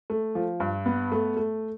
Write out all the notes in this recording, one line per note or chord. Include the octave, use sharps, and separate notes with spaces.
A3
F3
G2
B3
A3
A3